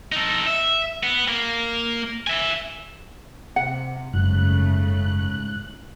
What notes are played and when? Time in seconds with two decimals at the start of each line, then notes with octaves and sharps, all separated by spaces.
0.12 D#4 A4
0.47 E5
1.03 B3
1.28 A#3
2.27 E5 G#5
3.56 C3 F#5
4.13 F#1 G#2 C#3 A3 F#6